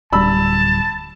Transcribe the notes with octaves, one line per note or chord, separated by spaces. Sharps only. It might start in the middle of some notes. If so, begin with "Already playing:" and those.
D1 G3 A5 B5 E6